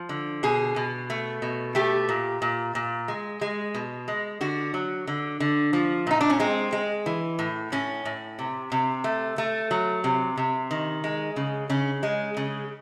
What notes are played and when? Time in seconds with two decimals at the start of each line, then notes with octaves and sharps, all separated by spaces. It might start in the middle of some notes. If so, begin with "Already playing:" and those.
Already playing: F3
0.09 D3
0.43 B2 G#4
0.76 B2
1.10 A3
1.42 B2
1.75 A3 G4
2.09 A#2
2.42 A#2
2.75 A#2
3.08 G#3
3.41 G#3
3.74 B2
4.08 G#3
4.41 D3 F#4
4.74 F#3
5.07 D3
5.40 D3
5.73 F3
6.07 A#2 D#4
6.21 D4
6.30 C#4
6.40 G#3 C4
6.72 G#3
7.06 E3
7.39 A2
7.72 A2 C#4
8.05 A2
8.39 C3
8.72 C3
9.04 A3
9.38 A3
9.71 F#3
10.04 C3
10.37 C3
10.71 D#3
11.04 G#3
11.36 C#3
11.70 C#3 C#4
12.03 G#3
12.37 C#3